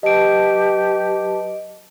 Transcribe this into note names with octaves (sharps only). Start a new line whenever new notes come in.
F#3 G4 B4 D#5 A5 D7